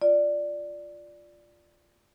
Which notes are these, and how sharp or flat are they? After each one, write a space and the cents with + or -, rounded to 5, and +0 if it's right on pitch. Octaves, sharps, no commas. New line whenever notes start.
F4 +0 D5 +0